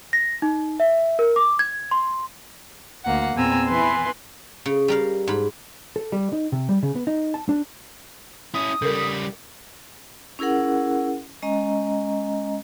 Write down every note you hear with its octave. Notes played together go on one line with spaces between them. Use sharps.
A#6
D#4
E5
A#4
D6
G#6
C6
D2 A#3 F#5
E2 A#2 C4 G#5 A#5 E6
E3 E4 B4 G#5 C6
C#3
G3 A#4 F5
G#2 B5
A4
G3
D#4
C3
G3
C#3
B3
D#4
A5
D4
C#4 E4 D#6
C#3 G3 A4 A#4
C#4 E4 G#4 A#4 F#5
G#3 C#4 D#5 A#5